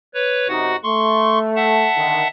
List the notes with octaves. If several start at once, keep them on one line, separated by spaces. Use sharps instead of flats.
B4 C#5
F#2 C3 D#4 F#4 F#5
A3 C6 C#6
E5 F#5 A5
D3 D#3